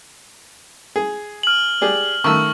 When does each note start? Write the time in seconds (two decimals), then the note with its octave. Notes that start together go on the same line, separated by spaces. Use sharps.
0.96 G#4
1.43 F6 F#7
1.81 G4 G#4 D5
2.24 D#3 A3 C#6 E6